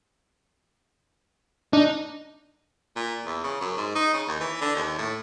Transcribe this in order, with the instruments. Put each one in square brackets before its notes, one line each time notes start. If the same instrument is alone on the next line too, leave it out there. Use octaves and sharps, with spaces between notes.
[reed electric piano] D4 [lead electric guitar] D#4
[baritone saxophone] A#2
E2
C#3
F#2
G#2
D#4
C#3
D#2
E3
D3
D#2
A2